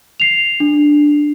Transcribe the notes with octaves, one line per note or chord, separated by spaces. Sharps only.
C7 F7
D4